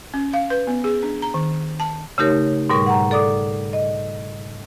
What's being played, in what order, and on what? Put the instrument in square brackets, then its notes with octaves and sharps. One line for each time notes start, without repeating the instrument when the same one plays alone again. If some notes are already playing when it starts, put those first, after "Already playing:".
[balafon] C#4
F5
B4
B3
G#4
D4
A#5
D#3
A5
[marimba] C#3 A3 D#4 G4 A#4 C#5
G#2 B2 G3 A#4 C#6
F#5 A#5
A4 D5 D6 D#6
D#5